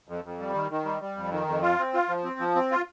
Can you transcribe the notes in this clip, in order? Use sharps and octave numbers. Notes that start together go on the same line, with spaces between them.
F2
F2
G3
D#3
D#3
G3
G3
F2
D#3
F2
F4
C4
F4
F3
C4
F3
C4
F4